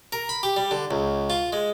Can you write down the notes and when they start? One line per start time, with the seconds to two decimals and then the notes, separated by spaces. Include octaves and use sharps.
0.12 A#4
0.29 B5
0.43 G4
0.56 G3
0.71 D3
0.91 C#2
1.30 F4
1.53 G#3